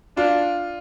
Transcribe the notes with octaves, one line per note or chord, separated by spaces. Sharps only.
D4 F4